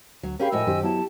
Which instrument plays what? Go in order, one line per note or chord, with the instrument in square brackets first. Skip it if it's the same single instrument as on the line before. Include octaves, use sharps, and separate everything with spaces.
[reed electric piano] D2 [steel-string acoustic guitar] F#3
[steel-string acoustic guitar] C#4 G4 G#4 [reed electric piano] A#4 G5 B5 [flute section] F5
[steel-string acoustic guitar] F2 A2 F#4 [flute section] D#5 G#5 E6
[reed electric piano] F#2 D#3 C5 [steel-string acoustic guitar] G4
[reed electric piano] F#3 B3 E4 [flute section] A5